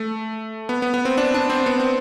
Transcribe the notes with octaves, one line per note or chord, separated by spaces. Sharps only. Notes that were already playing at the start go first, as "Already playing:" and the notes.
Already playing: A3
B3
B3
B3
C4
D4
D4
C4
B3
C4